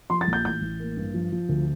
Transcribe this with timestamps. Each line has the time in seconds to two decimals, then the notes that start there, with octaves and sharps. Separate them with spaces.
0.10 F3 C6
0.21 A6
0.28 A#1
0.33 G6
0.45 A1 G6
0.62 A1
0.80 A#3
0.97 G2
1.14 F3
1.32 F3
1.49 D2